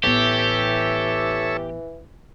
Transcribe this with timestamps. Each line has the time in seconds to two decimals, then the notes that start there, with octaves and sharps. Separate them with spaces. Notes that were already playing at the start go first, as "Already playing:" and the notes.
0.03 A1 E3 B3 G4 A4 C#5 E5